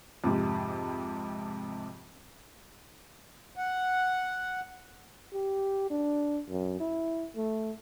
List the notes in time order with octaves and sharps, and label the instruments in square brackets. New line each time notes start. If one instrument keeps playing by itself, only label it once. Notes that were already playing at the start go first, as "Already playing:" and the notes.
[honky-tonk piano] F2 G#2 C3
[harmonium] F#5
[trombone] G4
D4
F#2
E4
A3